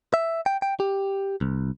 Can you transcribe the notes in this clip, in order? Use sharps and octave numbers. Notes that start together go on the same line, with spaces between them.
E5
G5
G5
G4
C2